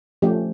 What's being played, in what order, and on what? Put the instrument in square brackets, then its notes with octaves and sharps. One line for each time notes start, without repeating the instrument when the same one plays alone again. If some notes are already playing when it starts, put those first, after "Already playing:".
[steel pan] F3 A3 C#4 G4